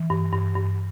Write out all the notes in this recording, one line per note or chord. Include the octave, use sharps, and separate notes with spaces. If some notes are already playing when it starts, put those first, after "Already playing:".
Already playing: E3
G2
G2
G2